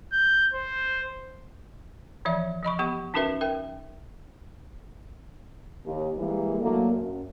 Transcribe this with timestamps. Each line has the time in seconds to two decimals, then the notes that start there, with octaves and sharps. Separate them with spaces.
0.13 G6
0.54 C5
2.25 E3 F3 C#5 E5
2.63 F3 D#5 B5 C#6
2.79 B3 G4 C#6
3.14 C#4 D#4 F#4 A#4 B4 E5
3.41 A#4 E5 G5
5.85 D#2
6.18 E3 G3 G#3 A#3
6.61 D3 F#3 A3 A#3
6.92 F#2